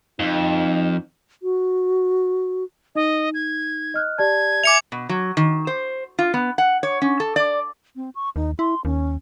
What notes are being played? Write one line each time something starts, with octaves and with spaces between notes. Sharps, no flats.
F2 D#4
F#4
D#4 D#5
G#6
D#5 F6 F#6
G4 D5 A5 G#6
E5 G#5 D6 C#7 F7
B2
F#3
D#3
C5
F4
B3
F#5
C#5
C#4
A4
D5
C4
C#6
D#2 D#4
E4 C6
D#2 C#4